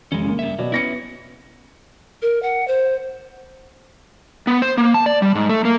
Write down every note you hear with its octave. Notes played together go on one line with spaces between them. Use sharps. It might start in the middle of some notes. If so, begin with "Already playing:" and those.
F1 G#3 C#4
C#3 A#3
G2 E5
B2 F#3 D5
B3 C#4 E4 A#6 C#7
A#4
F#5
C5
B3
C5
A#3
A5
D5
G3
G#2
A3
A#3